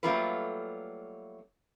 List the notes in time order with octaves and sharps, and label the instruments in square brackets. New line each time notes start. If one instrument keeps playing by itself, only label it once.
[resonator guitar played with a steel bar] F#3 G3 A3 A#3 F4 B4